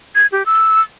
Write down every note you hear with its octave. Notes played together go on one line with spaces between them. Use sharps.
G#6
G4
E6